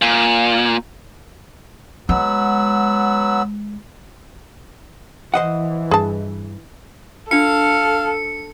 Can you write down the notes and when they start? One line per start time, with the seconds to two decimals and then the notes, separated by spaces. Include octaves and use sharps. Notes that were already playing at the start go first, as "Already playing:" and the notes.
0.02 A#2
2.09 F#3 G#3 B3 E6
5.34 E3 C5 D#5 F#5
5.91 G2 G#4 A5
7.31 D4 F4 A4 F5 C#7